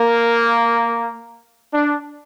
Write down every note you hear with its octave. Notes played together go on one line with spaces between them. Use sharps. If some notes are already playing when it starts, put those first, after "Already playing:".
Already playing: A#3
D4